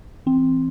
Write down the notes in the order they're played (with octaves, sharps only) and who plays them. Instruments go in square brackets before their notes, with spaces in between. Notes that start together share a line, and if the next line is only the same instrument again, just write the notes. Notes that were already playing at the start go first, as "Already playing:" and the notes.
[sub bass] E3 [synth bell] C4